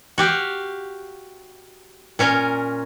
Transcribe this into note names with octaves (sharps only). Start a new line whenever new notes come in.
F#4 G4 F5
A#2 C#4 A#4